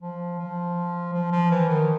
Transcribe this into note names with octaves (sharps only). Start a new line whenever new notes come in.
F3
F3
F3
F3
E3
D#3